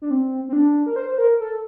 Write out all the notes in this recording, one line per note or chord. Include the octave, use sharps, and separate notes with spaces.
D4
C4
C4
D4
A#4
C5
C5
A#4
A4